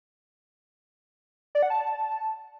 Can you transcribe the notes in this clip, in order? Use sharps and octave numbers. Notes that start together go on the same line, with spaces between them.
D5
F#5
A5